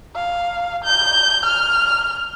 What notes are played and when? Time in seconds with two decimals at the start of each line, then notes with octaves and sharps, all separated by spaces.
0.15 F5
0.84 G6
1.46 F6